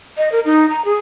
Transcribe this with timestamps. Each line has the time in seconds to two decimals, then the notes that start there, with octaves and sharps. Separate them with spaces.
0.18 D#5
0.32 A#4
0.45 D#4
0.70 A#5
0.85 G#4